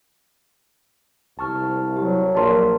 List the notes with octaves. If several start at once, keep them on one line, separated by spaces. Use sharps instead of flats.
C2 A5 C#6 F6
F#3 G4
A#1 A#4 D5 A5 C6